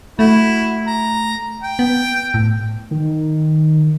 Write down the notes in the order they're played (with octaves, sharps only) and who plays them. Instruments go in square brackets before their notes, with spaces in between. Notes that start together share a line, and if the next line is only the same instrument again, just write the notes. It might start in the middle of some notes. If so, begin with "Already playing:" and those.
[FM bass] A3 [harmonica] E4 F#4
[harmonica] A#5
G5
[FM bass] B3
A2
[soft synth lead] D#3